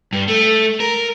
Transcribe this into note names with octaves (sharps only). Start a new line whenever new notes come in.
G2
A3
A#4